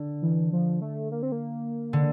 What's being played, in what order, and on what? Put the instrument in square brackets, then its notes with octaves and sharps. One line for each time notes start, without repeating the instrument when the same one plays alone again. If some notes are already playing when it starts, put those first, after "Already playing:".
Already playing: [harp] D3
[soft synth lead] E3
F3
A3
A#3
C4
A#3
[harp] D3